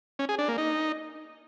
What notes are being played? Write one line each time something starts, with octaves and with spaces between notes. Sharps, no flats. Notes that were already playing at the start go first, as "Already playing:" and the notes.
C#4
G#4
D4
A#3
D#4